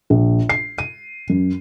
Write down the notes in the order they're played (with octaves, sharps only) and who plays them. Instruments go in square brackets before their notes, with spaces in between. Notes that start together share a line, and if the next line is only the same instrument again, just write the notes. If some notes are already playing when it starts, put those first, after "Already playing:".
[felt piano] A#1
C7
D#7
F#2